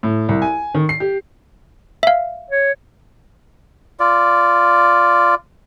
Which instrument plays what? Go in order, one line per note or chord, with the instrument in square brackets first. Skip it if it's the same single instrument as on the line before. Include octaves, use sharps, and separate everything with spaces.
[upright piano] A2
C2
G#5
D#3
C7
G4
[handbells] E5 F5
[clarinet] C#5
[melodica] F4 D5